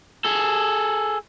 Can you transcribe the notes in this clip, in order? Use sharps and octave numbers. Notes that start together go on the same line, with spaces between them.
G#4 A4